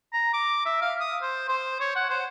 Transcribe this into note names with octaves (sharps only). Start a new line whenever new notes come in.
A#5
D6
E5
F5
D#6
C5
C5
C#5
F#5
C5